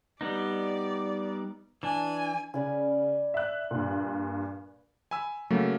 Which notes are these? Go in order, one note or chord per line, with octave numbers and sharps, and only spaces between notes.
G3 B3 D#4 D5
E3 D4 G#5
C#3 B4 D5 G#5
E5 F#6
G2 A#2
G#5 B5 E6
C#3 F#3 A3 A#3